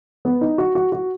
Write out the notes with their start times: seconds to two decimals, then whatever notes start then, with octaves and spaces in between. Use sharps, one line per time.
0.25 B3
0.41 D#4
0.58 F#4
0.75 F#4
0.92 F#4